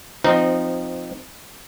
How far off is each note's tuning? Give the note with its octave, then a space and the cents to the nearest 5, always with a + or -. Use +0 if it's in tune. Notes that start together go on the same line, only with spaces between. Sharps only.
F3 +5 C4 -10 D#4 -10